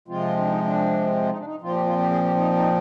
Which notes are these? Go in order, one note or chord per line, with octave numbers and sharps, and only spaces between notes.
C3 F3 G#3 C4 F4
D4
D#4
D4
F4
D#4
D4
D#4
A#2 F3 C4 F4
G4
F4
G4
G#4
G4
D#4
D#4